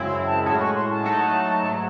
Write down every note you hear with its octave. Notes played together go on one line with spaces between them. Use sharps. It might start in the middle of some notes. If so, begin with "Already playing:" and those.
Already playing: F#2 C#3 G#3 C4 E4
A5
A2 G#3 C#4 F#4 A5
C#6
C6
A5
F#3 A3 D#4 F#4
G#2 F#3 A3